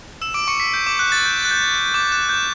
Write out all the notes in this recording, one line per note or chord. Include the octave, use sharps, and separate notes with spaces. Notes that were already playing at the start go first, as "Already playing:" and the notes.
E6 E7
D6 D7
C#6 C#7
B6
G6
D6
F#6
A6
G6
F#6
G6
D6
F#6
G6